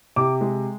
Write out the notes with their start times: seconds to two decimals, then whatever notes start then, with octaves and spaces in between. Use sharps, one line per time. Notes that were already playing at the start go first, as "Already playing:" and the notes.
0.16 C3 D6
0.41 G#3